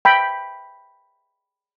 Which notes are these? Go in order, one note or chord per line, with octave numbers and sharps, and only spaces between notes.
G5 B5